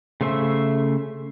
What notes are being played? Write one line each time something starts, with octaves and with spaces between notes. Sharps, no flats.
C#3 A3 C5 E5